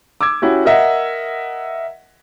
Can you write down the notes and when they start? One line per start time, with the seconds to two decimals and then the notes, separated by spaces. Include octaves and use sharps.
0.21 D6 E6 G#6
0.42 C#4 E4 F#4 G4
0.65 A#4 D#5 E5 F#5